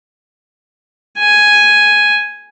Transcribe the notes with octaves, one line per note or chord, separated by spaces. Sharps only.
G#5